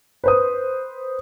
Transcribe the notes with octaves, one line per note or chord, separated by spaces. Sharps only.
B4 C5 D#6